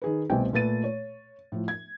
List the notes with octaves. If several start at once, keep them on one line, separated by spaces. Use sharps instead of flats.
D#3 G#4 B4
C2 B2 A3 C4 G5 G#5
A#2 A3 B4 A6 D#7
C#5
A2 F3
G#6